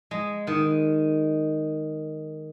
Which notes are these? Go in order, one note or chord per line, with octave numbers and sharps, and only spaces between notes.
G#3
D#3 F#5